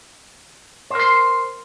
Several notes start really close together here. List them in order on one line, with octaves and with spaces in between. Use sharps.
C5 A#4 C6